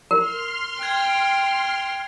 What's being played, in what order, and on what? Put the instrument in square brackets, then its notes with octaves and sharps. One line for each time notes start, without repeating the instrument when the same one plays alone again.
[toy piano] A#4 [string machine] C6 F6
[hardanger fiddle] G5 [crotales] F#6 G#6